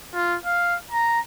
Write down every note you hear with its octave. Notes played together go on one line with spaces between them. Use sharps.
F4
F5
A#5